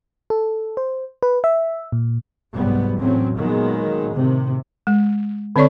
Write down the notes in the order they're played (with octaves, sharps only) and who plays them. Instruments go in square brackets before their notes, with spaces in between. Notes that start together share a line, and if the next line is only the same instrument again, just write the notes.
[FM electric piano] A4
C5
B4
E5
A#2
[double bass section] F1 C2 G#2 F#3 G3 B3
E2 A2 F#3 C4 C#4
A#2 D#3 F#3 G#3 A#3 B3
A2 C3 D#3
[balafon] G#3
D3 C4 A4 C#5 D5 C#6